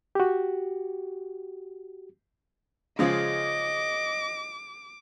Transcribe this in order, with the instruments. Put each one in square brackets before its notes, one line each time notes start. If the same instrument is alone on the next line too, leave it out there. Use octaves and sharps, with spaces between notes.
[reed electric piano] F#4 G4
[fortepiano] C#3 F3 G#3 [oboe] D#5 [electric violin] D6